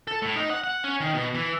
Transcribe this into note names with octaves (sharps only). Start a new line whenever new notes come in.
A4
A2
D#4
F#5
F#5
C#4
D#3
B2
E3